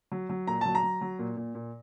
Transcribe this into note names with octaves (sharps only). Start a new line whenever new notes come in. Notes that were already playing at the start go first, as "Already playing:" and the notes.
F#3
F#3
A#2 A#5
F#3 A5
A#5
F#3
F#3
A#2
A#2
A#2